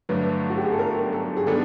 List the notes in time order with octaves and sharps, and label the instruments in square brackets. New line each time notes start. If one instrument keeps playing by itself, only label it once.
[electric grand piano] G2 D3 F#3 A3 D4 [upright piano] B4
[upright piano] F#4
G4
G#4
A4
A#4
A4
G#4
[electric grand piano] D#3 G3 B3 D4 [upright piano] A4